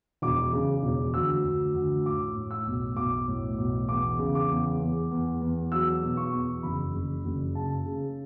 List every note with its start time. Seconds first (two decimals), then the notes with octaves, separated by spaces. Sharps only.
0.22 E1 D6
0.53 C#3
0.83 E1
1.13 D2 E6
1.44 D2
1.74 D2
2.06 A2 D6
2.35 A2
2.51 E6
2.67 B1
2.96 B1 D6
3.28 A2
3.58 B1
3.89 E2 D6
4.19 C#3
4.35 D6
4.50 E2
4.80 E2
5.11 E2
5.41 E2
5.72 F#3 E6
6.03 B2
6.17 C#6
6.33 E2
6.63 F#1 B5
6.94 F#1
7.25 F#1
7.55 C#3 A5
7.86 C#3